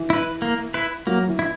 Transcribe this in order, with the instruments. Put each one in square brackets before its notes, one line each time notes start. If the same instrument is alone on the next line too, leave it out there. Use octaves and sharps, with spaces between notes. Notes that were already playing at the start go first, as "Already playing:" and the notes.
Already playing: [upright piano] E3
[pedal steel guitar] E4 B4
A#3
E4 B4
[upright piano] F#3 [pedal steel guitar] A#3
[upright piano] E3
[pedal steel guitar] E4